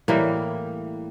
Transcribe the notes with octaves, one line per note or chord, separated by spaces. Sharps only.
A2 E3 G3 A#3